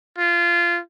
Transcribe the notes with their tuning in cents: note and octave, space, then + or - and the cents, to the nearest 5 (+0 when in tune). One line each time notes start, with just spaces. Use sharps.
F4 -20